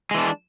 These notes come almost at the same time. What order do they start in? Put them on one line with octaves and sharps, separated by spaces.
G#3 E3 D4